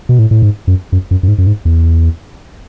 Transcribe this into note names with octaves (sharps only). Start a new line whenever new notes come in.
B2
A2
A2
G#2
F#2
F#2
F#2
F#2
G#2
F#2
G#2
E2